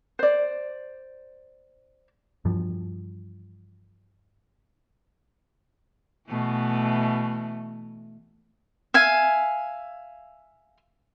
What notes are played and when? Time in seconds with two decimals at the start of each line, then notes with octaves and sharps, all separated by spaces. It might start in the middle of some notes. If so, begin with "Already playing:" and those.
0.19 C5 D5
2.45 G2 E3 F3 G3
6.29 B2 E3 A3
8.94 E5 F5 G#5